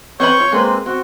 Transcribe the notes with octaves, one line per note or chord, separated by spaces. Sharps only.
C4 B4 C#5 B5 C#6 G6
F4
G#3 A#3 C4 B4
C4 F#4